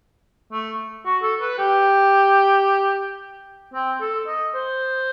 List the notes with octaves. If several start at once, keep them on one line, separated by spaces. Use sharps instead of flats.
A3
F#4
A4
B4
G4
C4
A4
D#5
C5